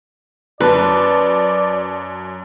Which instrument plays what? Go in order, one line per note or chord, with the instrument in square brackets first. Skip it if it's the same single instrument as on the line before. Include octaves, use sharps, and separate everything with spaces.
[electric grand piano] F#2 A5 [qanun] B4 [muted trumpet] D5